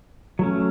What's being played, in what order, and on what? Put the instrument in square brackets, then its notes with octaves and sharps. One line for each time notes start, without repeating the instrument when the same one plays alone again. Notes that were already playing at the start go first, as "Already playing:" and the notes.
[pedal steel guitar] F#3 A3 C#4